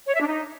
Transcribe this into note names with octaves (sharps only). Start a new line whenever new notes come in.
C#5
E5
D4
D#4